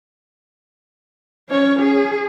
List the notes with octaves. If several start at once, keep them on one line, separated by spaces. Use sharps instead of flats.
C#4 C#5
G#4